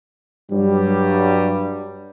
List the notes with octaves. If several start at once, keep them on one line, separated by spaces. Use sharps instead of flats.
G2 F#3 G3